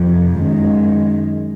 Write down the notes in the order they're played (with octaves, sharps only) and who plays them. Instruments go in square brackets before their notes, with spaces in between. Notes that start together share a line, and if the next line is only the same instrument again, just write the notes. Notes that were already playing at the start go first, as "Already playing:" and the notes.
Already playing: [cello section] F2 C3 F3
F#2 D#3 G#3